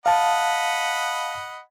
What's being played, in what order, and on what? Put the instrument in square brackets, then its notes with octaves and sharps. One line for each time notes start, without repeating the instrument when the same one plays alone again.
[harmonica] D#5 F#5 B5 [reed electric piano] F5 A5